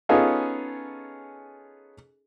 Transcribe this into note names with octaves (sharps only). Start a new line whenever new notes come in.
B3 C#4 D#4 F4 G#4 A4